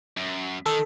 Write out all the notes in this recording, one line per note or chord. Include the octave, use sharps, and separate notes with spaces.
F#2
D#3 A4